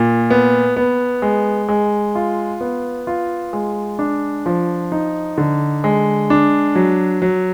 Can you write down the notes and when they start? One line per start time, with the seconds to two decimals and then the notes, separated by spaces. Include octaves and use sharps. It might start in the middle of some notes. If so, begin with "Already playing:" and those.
Already playing: A#2
0.30 B3
0.76 B3
1.22 G#3
1.69 G#3
2.15 F4
2.61 B3
3.07 F4
3.53 G#3
3.99 D4
4.46 F3
4.92 D#4
5.38 D3
5.84 G#3
6.30 D4
6.75 F#3
7.22 F#3